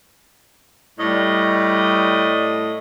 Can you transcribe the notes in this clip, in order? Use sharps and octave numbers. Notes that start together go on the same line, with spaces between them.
A2 G3 D#5